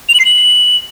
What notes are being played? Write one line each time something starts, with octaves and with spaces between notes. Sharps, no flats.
F7
F#7
C7
F#7